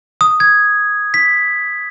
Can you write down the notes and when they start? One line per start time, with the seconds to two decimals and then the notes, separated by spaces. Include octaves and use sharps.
0.21 D#6
0.40 G#6
1.14 B6